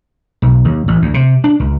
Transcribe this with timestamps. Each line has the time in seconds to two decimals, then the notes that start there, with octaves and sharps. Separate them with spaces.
0.42 B1
0.65 D#2
0.88 A1
1.02 D2
1.14 C3
1.44 D4
1.60 C#2